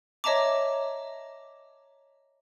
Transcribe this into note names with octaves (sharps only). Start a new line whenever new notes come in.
C#5 D#5 E5 A5 A#5 D6